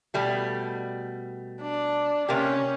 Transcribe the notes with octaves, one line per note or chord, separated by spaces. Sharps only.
B2 G3 A3
D4
C3 A#3 C#4 G4